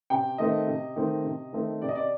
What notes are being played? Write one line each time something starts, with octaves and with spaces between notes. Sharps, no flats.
C3 G5
D#3 A3 C4 D#5
C3
D#3 A3 C4
C3
D#3 A3 C4
C3 D5
D#5
D5